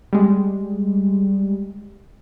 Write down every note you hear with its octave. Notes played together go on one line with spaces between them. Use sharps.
G3 G#3